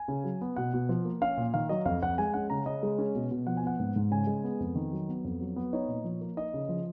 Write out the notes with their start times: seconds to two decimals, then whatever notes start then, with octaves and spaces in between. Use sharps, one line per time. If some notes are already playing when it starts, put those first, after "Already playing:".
Already playing: G#5
0.08 C#3
0.24 F#3
0.41 B3
0.56 B2 F#5
0.74 B2
0.89 F3
1.05 A#3
1.21 C#4 F5
1.37 A#2
1.54 D#3 F5
1.69 F#3 D#5
1.85 F2 F5
2.03 F2 F#5
2.18 G#3 G#5
2.34 C#4 F#5
2.50 C#3 A#5
2.66 C#3 D#5
2.83 G#3
2.98 C#4
3.15 B2
3.31 B2
3.47 F3 F#5
3.57 G#5
3.64 B3 F#5
3.80 G#2
3.96 G#2
4.11 C#3 G#5
4.27 G#3
4.44 B3
4.60 F2
4.75 D#3
4.92 F#3
5.09 B3
5.25 F2
5.41 F#3
5.56 B3
5.73 D#4 C#5
5.88 A#2
6.04 F3
6.21 A#3
6.37 D#4 D#5
6.54 C#3
6.69 F3